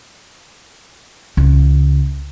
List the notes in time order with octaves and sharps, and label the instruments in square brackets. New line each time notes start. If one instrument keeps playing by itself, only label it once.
[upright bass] C#2